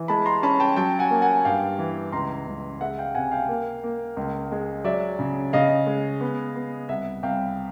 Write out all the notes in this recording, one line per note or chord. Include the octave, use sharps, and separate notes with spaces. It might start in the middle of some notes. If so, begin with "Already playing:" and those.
Already playing: E3
G#3 A5 B5
A#5 C6
C#4 A5 B5
G5 A5
F#3 G5 A5
F#5 G#5
A#3
F#5 G#5
G2 F5 G5
E3
C#2 A#5 C6
C#2
G#3 E5 F#5
F5 G5
C3 F#5 G#5
F5 G5
A#3
A#3
C#2
G#3
F#3 D5 E5
C#3
C#3 D#5 F5
G#3
B3
B3
C2 E5 F#5
C2 F5 G5